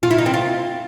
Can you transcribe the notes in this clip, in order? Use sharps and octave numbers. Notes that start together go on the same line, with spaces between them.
F4
E4
D#4
C4
F4